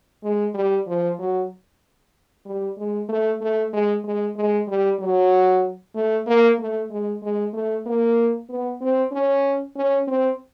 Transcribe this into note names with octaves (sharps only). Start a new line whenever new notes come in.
G#3
G3
F3
F#3
G3
G#3
A3
A3
G#3
G#3
G#3
G3
F#3
A3
A#3
A3
G#3
G#3
A3
A#3
B3
C4
C#4
C#4
C4